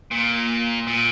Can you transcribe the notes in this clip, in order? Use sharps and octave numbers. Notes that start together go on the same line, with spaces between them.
A#2
A#2